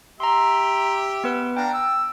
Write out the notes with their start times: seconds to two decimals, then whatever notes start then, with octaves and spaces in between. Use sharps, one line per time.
0.20 G4 E5 A#5 C6
1.24 B3 B4
1.57 D4 F5 G5 A#5
1.74 E6